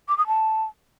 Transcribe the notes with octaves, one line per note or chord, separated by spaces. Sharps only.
D6
D#6
A5